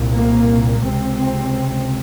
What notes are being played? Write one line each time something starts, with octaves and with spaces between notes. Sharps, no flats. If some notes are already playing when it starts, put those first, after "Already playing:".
Already playing: C2 A#2
A#3
C#2 C3 C4
C4